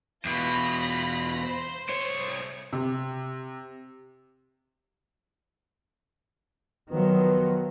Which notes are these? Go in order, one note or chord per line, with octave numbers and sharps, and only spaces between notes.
E2 B2 F4 B5 A#6
C5
C2 C#5
C3
D#3 F3 F#3 B3